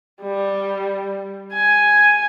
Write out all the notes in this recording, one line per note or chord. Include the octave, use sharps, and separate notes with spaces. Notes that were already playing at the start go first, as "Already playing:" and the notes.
G3
G#5